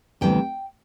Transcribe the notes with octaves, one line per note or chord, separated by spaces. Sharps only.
D2 C3 E3 G3 B3 G5